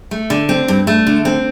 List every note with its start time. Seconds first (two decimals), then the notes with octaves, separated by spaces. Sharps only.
0.11 A3
0.30 D3
0.49 C4
0.68 G2
0.87 A3
1.07 D3
1.25 C4